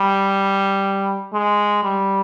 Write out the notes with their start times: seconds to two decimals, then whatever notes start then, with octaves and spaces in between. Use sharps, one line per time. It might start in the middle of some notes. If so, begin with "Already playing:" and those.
Already playing: G3
1.33 G#3
1.83 G3